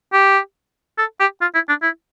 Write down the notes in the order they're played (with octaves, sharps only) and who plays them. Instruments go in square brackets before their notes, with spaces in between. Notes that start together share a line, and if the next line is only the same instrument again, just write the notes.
[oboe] G4
A4
G4
F4
E4
D4
E4